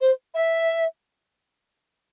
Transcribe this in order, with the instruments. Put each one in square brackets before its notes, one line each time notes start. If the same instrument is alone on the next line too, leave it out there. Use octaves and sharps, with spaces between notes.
[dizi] C5
E5